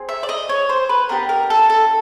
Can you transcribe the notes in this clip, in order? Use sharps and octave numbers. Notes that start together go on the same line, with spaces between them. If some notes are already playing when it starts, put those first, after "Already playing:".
Already playing: C4 G#4
E5
D5
D#5
C#5
C5
B4
B3 D4 G4 A#4
A#4
A4
A4